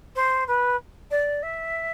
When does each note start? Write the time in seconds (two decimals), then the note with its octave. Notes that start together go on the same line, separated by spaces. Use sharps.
0.15 C5
0.47 B4
1.10 D5
1.42 E5